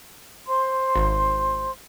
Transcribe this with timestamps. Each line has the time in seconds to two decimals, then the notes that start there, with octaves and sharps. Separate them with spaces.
0.47 C5 C6
0.96 G#1